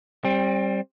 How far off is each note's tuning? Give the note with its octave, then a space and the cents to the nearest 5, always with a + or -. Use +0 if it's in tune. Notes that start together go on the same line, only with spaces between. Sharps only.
G3 +0 C4 +25